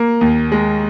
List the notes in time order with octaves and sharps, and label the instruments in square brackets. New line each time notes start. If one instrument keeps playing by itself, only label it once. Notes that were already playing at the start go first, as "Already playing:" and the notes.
Already playing: [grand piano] A#3
D#2
G#3